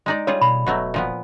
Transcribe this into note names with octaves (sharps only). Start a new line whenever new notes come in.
G#3 D#4 D5
G3 F4 G#4 C#5
B2 B5
E1 B2 F#3 A3
A#2 F3 B3